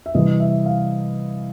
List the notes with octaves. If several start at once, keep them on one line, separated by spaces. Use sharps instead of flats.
E5
C3 E3 G3 D#5
E5
F5